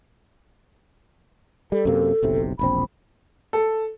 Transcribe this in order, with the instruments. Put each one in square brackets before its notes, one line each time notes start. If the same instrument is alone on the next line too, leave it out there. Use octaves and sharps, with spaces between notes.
[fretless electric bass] G3 [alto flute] A4
[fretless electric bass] F#2 C3 A#3
F#1 B1 C3
[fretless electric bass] E1 A#1 C4 [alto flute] B5
[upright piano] A4